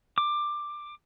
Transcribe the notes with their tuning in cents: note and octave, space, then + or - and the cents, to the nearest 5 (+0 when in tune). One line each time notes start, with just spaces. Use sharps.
D6 +15